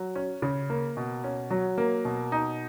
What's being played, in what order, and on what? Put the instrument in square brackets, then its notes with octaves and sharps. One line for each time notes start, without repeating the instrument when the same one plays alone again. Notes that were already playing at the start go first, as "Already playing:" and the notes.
Already playing: [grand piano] F#3
C#4
C#3
A#3
B2
C#4
F#3
A#3
B2
D#4